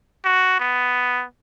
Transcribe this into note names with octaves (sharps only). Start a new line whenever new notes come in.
F#4
B3